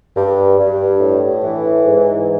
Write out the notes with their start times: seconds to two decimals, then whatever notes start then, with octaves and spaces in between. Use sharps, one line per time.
0.16 G2
0.58 G2
1.00 A2
1.42 E3
1.84 G#2